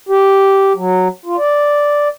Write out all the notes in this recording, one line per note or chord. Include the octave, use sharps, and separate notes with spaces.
G4
F#3
F4
D5